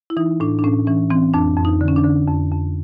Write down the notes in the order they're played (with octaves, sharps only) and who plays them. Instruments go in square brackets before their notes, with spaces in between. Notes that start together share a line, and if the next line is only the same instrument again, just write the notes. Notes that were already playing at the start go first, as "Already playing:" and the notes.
[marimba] E4
E3 D#4
A2 D4
D4
A2 C#4
E3 C#4
E3 C4
F2 D4
F2
D#4
D3
C#4
D4
D3
F2
F2